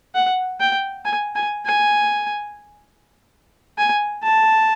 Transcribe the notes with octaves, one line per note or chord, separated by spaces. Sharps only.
F#5
G5
G#5
G#5
G#5
G#5
A5